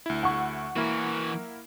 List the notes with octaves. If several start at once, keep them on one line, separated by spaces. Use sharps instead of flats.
D2 E4
F#5 C#6
E3 A#3 E4 F#4 A#4